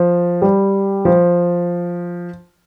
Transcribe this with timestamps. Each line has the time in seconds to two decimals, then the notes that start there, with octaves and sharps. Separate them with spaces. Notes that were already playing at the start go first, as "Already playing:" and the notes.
Already playing: F3
0.42 G3
1.05 F3